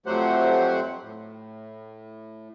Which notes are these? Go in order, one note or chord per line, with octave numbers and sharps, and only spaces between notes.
F2 F#3 A3 G4 C5 F#5
A2